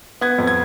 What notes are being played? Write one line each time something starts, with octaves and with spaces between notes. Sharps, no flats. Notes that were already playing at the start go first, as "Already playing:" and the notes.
B3 G#6
F2
G#6